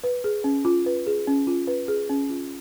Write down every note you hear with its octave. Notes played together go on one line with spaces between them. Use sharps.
B4
G#4
C#4
F4
B4
G#4
C#4
F4
B4
G#4
C#4
F4